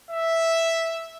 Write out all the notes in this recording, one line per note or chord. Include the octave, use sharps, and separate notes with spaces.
E5